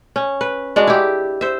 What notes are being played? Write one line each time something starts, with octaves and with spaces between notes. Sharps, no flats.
C#4
B4
G#3 D4 F#4
E4 G4
C5 E5